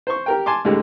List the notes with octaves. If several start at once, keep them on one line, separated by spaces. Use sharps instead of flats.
C5 C#6
G4 A#4 G5
G#5 A5 C6 D6
D2 A2 D3 G3 G#3